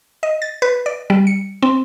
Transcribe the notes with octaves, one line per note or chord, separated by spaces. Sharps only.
D#5
A6
B4
D5
G3
C#7
C4